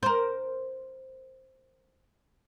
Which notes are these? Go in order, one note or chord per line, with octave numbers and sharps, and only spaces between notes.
A#4 C5